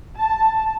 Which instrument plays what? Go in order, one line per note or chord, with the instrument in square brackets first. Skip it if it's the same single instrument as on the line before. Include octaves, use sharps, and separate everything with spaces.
[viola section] A5